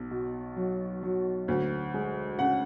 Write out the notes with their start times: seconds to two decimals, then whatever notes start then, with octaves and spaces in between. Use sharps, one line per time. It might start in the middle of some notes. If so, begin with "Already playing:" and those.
Already playing: B1
0.11 B2
0.56 F#3
1.03 F#3
1.48 D2
1.94 G#3
2.39 C#3 F#5